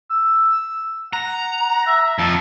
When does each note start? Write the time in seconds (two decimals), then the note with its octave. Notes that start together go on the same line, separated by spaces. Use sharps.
0.10 E6
1.13 F#5 A#5
1.87 E5
2.19 F2 F3 A5